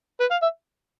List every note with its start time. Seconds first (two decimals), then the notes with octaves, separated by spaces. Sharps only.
0.20 B4
0.31 F5
0.42 E5